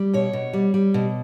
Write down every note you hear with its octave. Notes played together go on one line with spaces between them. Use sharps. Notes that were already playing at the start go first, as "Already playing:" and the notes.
Already playing: G3
B2 C#5
B2
G3
G3
B2